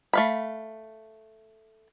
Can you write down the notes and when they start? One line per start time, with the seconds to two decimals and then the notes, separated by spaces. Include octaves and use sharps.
0.13 A3 F5 B5